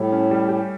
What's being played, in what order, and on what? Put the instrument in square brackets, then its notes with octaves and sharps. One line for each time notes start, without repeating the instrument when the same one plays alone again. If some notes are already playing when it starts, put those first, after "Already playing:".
Already playing: [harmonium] A2 [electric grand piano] G3 E4
[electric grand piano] C#4
G3
G4